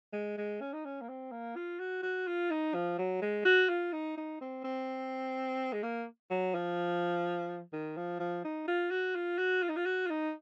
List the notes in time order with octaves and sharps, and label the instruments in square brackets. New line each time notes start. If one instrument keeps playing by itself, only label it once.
[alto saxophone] G#3
G#3
C#4
D#4
C#4
A#3
C4
A#3
F4
F#4
F#4
F4
D#4
F3
F#3
G#3
F#4
F4
D#4
D#4
C4
C4
G#3
A#3
F#3
F3
D#3
F3
F3
D#4
F4
F#4
F4
F#4
F4
D#4
F4
F#4
F4
D#4